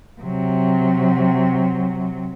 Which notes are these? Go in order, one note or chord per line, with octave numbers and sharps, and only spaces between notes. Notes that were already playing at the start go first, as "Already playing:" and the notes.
C3 F#3